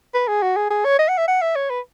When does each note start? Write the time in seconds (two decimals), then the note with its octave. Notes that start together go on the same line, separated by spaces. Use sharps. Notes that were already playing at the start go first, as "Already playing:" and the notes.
0.14 B4
0.28 G#4
0.43 F#4
0.56 G#4
0.70 G#4
0.85 C#5
0.99 D#5
1.09 F#5
1.18 E5
1.28 F#5
1.42 E5
1.56 C#5
1.70 B4